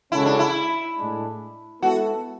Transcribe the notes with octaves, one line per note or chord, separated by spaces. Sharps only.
C#3 G#3 C#4 E4 F#4 A4
D4
E4
A2 G#3 D4
G#3 B3 E4 F#4 A4